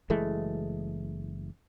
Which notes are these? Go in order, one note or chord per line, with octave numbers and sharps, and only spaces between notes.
F#1 E3 G#3 A3